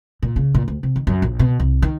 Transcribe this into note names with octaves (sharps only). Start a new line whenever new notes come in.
A#2
C#3
A#2
D2
C3
D#3
F#2
A#1
B2
C2
D#3